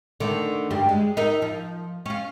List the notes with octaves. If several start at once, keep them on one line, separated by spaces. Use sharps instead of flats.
D3 D#3 A3
D2 G2 G3
G#3
D#4 A#4 E5
F3
C#4 F4